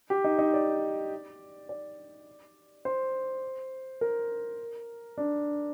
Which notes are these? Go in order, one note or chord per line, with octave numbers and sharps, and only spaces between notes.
G4
D#4
D#4
D5
D5
C5
A#4
D4